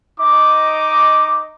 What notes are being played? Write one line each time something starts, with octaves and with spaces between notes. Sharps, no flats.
D#4 D#5 D6